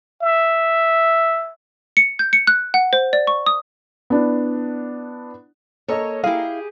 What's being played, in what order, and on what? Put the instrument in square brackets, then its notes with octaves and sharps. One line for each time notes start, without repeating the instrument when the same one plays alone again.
[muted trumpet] E5
[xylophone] C#7
G6
C#7
F#6
F#5
C5
D5
C#6
D#6
[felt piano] B3 D4 E4
[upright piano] A#3 A4 D#5 [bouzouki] C#5
[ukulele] E4 F5 [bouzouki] G4 G#4